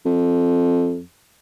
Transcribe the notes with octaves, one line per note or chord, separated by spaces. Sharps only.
F2